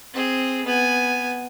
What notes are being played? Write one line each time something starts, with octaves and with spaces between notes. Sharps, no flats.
C4 G#4
B3 G#5